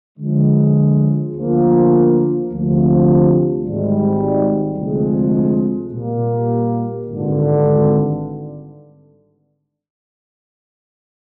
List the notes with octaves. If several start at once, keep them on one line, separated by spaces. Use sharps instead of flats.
D3 F3 G#3
D2 D3 F3 A#3 F4
D2 C3 F3
G#1 G#2 G3
D2 C3 F3 G#3
A#2 G3 A#3
G#1 G2 D3